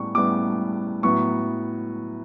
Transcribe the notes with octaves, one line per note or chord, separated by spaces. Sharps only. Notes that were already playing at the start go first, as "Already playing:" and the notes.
Already playing: A2 G3 B3 C#6
A2 G3 B3 D6
A2 F#3 B3 C#6